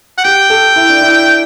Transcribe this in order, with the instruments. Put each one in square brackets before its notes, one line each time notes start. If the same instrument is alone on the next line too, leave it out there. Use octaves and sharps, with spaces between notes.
[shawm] F#5
[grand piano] G4 [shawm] G5
[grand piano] A4
E4
D4
E4